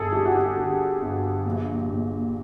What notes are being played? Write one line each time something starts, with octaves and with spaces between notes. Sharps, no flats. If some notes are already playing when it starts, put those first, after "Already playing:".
Already playing: G1 G#4 A4
G2 G4
F#4
G4
D3
G1
A#1
A#1